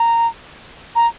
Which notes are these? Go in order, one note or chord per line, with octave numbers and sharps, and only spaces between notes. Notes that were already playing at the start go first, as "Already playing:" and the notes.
Already playing: A#5
A#5